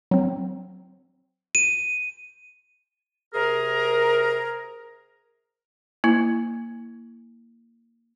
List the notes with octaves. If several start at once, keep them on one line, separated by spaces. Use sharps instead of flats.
F#3 C4
D#7
C3 G#4 A#4
A#3 E4